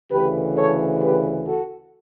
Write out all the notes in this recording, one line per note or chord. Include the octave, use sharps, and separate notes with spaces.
D2 C#3 E3 G4 B4
A4 C#5
G4 B4
F#4 A4